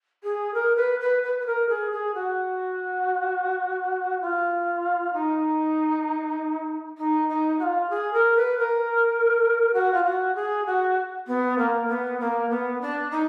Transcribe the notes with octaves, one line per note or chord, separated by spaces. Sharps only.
G#4
A#4
B4
B4
B4
B4
A#4
G#4
G#4
F#4
F4
D#4
D#4
D#4
F#4
F4
G#4
A#4
B4
A#4
F#4
F4
F#4
G#4
F#4
B3
A#3
B3
A#3
B3
D4
D#4